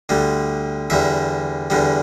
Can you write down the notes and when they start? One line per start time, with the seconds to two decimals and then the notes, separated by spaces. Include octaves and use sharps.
0.09 D2 D3 G3
0.90 E2 D3 G3 E5
1.70 E2 D3 G3